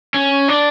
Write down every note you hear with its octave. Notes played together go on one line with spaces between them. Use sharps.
C#4
D4